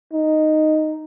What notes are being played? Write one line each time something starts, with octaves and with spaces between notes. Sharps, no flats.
D#4